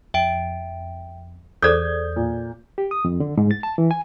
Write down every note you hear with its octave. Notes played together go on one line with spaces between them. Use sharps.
F2 E5 G5 D7
E2 G#4 A4 C5 D5 D#6 G6 G#6
A#2
G4
D#6
F2
D3
G#2
A6
A5
E3
G#5